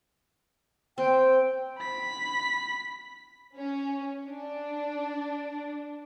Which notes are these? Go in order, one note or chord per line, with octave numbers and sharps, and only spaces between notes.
C4 G5
B5 B6
C#4
D4